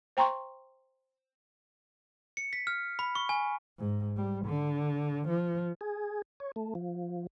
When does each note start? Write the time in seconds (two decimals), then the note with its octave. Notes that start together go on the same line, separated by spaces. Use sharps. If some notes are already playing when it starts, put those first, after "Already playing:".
0.17 C5 G5 A#5 C6 C#6
2.37 C#7
2.53 B6
2.67 F6
2.99 B5
3.15 C#6
3.29 G#5
3.79 G#2
4.17 G3
4.45 D3
5.28 F3
5.81 G#4
6.40 C#5
6.56 A3
6.75 F3